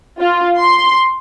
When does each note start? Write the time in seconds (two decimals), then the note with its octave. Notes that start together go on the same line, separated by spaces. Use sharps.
0.20 F4
0.58 C6